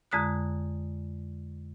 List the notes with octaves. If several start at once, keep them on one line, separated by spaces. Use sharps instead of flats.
F2 D3 G#3 A#5 D#6 F#6